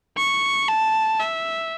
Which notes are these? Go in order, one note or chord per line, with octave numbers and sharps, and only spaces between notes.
C#6
A5
E5